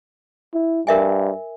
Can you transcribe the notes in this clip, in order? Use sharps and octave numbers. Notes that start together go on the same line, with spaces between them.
E4
G2 A#4 E5 G#5